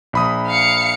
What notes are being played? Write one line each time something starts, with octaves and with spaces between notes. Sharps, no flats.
A#1 B5 D#6
F5 C#7